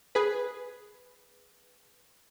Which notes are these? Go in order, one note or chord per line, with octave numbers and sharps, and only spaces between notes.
G#4 B4